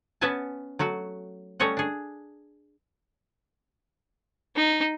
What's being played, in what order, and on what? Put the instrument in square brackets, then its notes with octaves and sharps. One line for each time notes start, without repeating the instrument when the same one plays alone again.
[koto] B3 C#4 B4 E5 G#5 A5
F#3 A3 F#4
G3 A3 C#4 C#5 D#5 F#5
D4 G#4
[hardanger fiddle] D#4